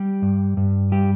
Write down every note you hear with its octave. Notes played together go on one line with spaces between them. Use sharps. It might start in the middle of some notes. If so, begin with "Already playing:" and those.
Already playing: G3 G4
G2
G2
G3 G4